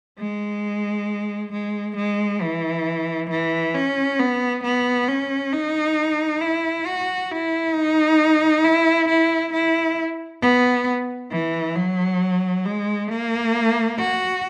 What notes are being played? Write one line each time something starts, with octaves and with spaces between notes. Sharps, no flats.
G#3
G#3
G#3
E3
E3
C#4
B3
B3
C#4
D#4
E4
F#4
E4
D#4
E4
E4
E4
B3
E3
F#3
G#3
A#3
F#4